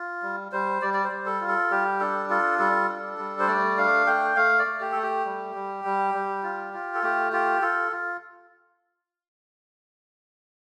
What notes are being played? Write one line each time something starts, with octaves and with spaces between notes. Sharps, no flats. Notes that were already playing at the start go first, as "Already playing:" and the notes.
Already playing: F4
G3
G3 C5
G3 D5
D5
C5
G3
A4
F4
A4
G3 G4
D4 A4
F4 A4
G3 A4
D4
G3
C5
A3 D5
D4 F5
A3 G5
A3 F5
D5
A3
G4
A3 A4
G4
G3
G3
G3
G3
F4
F4
A4
A3 G4
F4 G4
F4 A4
F4